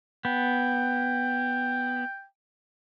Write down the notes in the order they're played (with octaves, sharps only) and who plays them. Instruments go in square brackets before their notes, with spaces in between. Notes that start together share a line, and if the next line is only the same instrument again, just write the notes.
[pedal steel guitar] B3 [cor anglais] G5